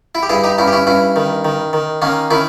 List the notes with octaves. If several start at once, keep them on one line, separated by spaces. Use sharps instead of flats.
E4
G4
G2 E4 G#4
D#4 G4
G2 C#4 E4
G4
C#4 E4
G2 C#4 E4
D#3
D#3
D#3
D#3 A#3 C#4
D#3 C#4 E4